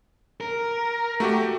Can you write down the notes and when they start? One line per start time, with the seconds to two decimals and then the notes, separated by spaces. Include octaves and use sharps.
0.41 A#4
1.20 A3 F#4 G4